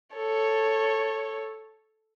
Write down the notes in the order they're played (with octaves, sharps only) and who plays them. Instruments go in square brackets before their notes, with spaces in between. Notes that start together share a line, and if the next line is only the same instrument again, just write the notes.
[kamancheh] A4 C#5